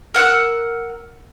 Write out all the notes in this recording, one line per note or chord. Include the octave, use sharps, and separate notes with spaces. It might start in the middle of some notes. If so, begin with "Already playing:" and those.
A#4 F#5 E6 F#6